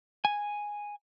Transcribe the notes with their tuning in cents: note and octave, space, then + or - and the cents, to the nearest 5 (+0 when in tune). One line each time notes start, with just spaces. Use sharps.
G#5 -5